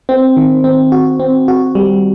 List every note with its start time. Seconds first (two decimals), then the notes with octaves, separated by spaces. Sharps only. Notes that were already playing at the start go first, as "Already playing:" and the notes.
0.09 C4
0.37 D#3
0.64 C4
0.92 F#4
1.20 C4
1.48 F#4
1.75 G3